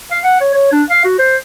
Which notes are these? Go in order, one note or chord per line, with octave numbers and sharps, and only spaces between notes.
F5
F#5
C#5
C#5
D4
F5
F#4
C5